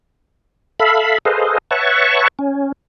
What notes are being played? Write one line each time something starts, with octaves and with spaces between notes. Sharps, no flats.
A4 E5 F5 B5
G#4 A4 B4 C5 D#5 F5
B4 C#5 E5 F#5 A5 C#6
C#4